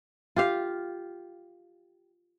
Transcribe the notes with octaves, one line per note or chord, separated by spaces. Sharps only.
F4 G4 F5